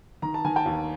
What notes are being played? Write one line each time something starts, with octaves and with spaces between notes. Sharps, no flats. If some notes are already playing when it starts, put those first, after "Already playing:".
D#3 A#5
A5
D#3 G#5
G5 A5
D#2